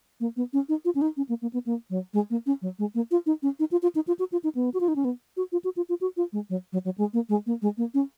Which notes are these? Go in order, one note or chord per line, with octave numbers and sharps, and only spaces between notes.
A#3
B3
C#4
D#4
F4
C#4
D#4
C#4
A#3
A#3
B3
A#3
F#3
G#3
A#3
C#4
F#3
G#3
A#3
F4
D#4
C#4
D#4
F4
F4
D#4
F4
F#4
F4
D#4
B3
F#4
F4
D#4
C#4
B3
F#4
F4
F#4
F4
F4
F#4
F4
G#3
F#3
F#3
F#3
G#3
A#3
G#3
A#3
G#3
A#3
C#4